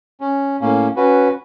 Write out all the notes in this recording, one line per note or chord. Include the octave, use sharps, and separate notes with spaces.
C#4
A2 A#3 C#4
C#4 F#4 B4